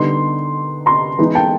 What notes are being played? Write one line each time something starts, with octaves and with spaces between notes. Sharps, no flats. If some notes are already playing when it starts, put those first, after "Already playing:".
Already playing: D3 G3 B3 D#4 C6
A#5 C6
E3 G#3 B3 D#4
G5 A5